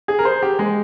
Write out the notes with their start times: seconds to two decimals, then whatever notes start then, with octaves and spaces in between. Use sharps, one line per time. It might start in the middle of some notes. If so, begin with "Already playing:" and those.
0.08 G#4
0.19 A#4
0.25 C5
0.43 G4
0.59 G#3